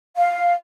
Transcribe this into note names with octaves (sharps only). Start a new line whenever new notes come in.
F5